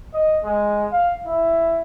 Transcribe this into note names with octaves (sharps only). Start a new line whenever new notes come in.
D#5
G#3
F5
E4